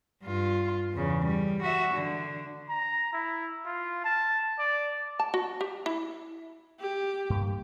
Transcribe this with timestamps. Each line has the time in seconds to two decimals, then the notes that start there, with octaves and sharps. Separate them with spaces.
0.23 G2 F4
0.94 E2 C#3
1.25 G3
1.62 F#4 E5
1.94 D3
2.69 A#5
3.13 E4
3.65 F4
4.05 A5
4.59 D5
5.19 A5
5.34 F#4
5.61 G4
5.86 E4
6.80 G4
7.30 G2 A#3